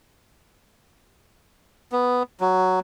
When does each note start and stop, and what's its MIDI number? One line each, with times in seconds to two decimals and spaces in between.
1.92 2.23 59
2.41 2.80 54